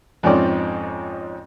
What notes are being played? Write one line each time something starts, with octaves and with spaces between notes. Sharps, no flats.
F2 G#2 F3 C4 C#4 D5